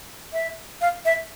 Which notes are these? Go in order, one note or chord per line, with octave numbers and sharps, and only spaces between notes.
E5
F5
E5